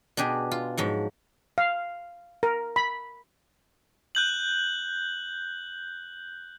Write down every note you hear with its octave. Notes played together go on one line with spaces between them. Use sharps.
B2 D4 G4 G#4
F4
G#2 F3 F#3
F5
A#4
B5
F#6 G6 F#7